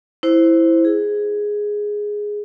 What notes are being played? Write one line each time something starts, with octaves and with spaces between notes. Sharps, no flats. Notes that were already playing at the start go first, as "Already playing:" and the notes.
E4 C5
G#4